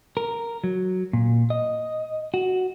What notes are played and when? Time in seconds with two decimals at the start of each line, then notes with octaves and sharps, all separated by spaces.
0.17 A#4
0.64 F#3
1.13 A#2
1.50 D#5
2.34 F#4